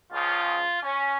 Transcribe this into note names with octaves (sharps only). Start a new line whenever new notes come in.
C#2 C#3 F3 F4
C#4